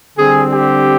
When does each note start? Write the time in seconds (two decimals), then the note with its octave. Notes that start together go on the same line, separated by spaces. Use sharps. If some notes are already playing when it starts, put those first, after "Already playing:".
0.18 D3 G3 C4 G#4
0.53 G4